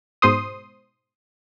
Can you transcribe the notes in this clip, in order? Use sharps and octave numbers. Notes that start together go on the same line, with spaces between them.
G#2 B2 C5 C6 D#6